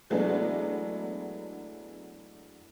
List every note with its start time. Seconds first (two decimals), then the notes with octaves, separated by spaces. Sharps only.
0.10 E3 F#3 G#3 A3 B3 D4